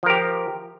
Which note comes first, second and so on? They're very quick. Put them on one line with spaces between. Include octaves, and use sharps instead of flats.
F3 A#4 G4